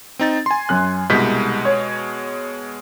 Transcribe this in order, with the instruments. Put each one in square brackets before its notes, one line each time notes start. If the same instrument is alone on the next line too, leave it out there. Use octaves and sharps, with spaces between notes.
[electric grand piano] C4 D#4 A6
G#5 C6
[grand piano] F#2 F#6
[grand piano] C2 G6 B6 [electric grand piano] B2 G#3
[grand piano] C#5